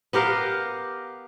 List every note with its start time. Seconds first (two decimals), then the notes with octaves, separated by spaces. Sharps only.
0.13 B3 G4 A#4 F5